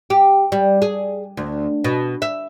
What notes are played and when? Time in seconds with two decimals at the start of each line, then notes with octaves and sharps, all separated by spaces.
0.10 G4
0.52 G3
0.82 G#4
1.37 D2
1.84 B2
2.22 E5